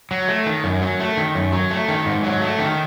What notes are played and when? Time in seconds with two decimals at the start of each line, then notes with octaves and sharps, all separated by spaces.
0.11 F#3
0.28 A3
0.46 D#3
0.64 F#2
0.82 F#3
1.00 A3
1.17 D#3
1.35 F#2
1.53 F#3
1.71 A3
1.88 D#3
2.06 G#2
2.24 F#3
2.41 A3
2.59 D#3